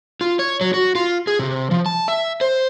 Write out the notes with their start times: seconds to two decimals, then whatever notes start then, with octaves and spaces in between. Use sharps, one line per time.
0.21 F4
0.39 C#5
0.61 F#3
0.74 F#4
0.95 F4
1.27 G#4
1.39 C3
1.71 F3
1.86 A5
2.08 E5
2.41 C5